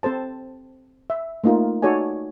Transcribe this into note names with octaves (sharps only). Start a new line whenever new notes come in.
C4 A4 C5 A5
E5
A3 A#3 D#4 F4 A#4
D#4 F#4 A4 C#5 D5 G#5